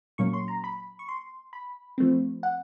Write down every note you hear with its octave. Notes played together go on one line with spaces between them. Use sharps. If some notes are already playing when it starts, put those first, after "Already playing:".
A#2 F#3 A#3 C#4 C#6
C6
A#5
B5
C#6
C6
B5
F3 A3 C4
F#5